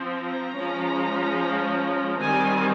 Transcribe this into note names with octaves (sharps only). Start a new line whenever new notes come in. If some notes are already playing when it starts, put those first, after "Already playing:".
Already playing: F3 C4
A#5
F3 G#3 C#4
D#3 G3 C4 G#5